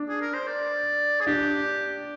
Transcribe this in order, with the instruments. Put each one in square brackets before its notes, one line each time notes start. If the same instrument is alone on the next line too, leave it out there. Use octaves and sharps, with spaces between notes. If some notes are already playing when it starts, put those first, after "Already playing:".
Already playing: [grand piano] D4
[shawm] G#4
A#4
C5
D5
G#4
[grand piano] D4 [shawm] G4